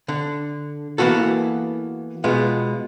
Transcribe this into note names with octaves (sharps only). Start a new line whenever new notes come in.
D3
E3 A#3 B3 F#4 A4
B2 G#3 B3 F4